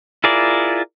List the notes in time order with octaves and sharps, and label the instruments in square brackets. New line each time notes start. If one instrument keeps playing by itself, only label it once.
[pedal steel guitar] E4 F4 G#4 A#4 D5